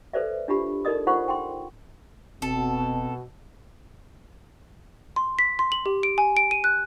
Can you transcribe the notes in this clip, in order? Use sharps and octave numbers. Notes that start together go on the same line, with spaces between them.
A4 B4 C5 D5 E5
D4 F4 G4 B5
D#4 A4 A#4 D5 D#5 D#6
D#4 F4 C5 F#5 B5 C#6
G5 C6
F1 B2 C4 A4
C6
B6
C6
F#7
G4
D7
G#5
D7
D#7
F#6